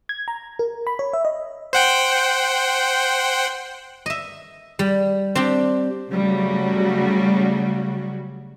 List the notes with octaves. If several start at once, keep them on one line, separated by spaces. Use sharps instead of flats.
G#6
A#5
A#4
B5
C#5
E5
D#5
C5 F#5 G5
D#5 E5
G3
C4 D4 G4
C#3 F#3 G3 A3 F#4